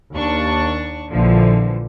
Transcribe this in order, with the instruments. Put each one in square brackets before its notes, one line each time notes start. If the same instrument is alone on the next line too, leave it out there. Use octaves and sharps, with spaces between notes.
[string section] D#2 D4 C#6
A#1 D3 E3 F3